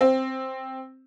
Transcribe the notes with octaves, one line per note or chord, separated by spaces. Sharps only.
C4